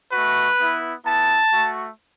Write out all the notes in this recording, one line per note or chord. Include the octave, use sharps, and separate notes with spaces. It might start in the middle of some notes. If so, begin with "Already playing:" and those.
A3 F#4 B4
B3 E4
B3 E4 A5
A3 F#4